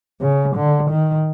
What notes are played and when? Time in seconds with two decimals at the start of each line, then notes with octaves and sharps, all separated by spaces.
0.21 C#3
0.55 D3
0.90 D#3